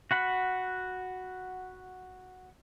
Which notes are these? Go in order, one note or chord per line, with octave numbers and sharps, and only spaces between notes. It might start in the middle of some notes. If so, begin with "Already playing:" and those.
F#4 F#5 B5